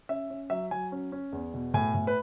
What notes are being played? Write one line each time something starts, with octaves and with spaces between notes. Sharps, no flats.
C#4 E5
C#4
F#3 E5
F#3 G#5
C#4
C#4
E2
B2
A2 G#5
A2
B4